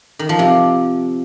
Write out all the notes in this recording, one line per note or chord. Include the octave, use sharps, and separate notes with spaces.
D#3
F3
C3